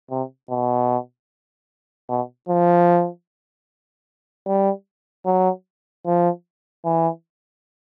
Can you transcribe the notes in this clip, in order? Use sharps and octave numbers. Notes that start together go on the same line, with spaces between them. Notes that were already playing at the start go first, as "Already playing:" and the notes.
C3
B2
B2
F3
G3
F#3
F3
E3